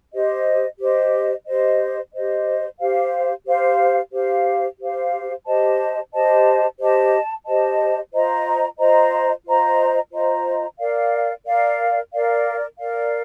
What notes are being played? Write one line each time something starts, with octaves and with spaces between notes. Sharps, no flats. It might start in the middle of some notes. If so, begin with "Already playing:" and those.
G4 C5 D#5
G4 C5 D#5
G4 C5 D#5
G4 C5 D#5
G4 C5 F5
G4 C5 F5
G4 C5 F5
G4 C5 F5
G4 C5 D#5 A5
G4 C5 D#5 A5
G4 C5 D#5 A5
G4 C5 D#5 A5
F4 C5 D#5 A#5
F4 C5 D#5 A#5
F4 C5 D#5 A#5
F4 C5 D#5 A#5
A#4 D5 F5
A#4 D5 F5
A#4 D5 F5
A#4 D5 F5